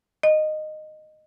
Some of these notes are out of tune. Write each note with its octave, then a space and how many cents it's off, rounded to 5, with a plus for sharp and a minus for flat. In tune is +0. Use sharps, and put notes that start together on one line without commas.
D#5 -10